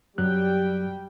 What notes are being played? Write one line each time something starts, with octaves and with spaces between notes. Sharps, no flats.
F#2 F#3 G3 G5 F#6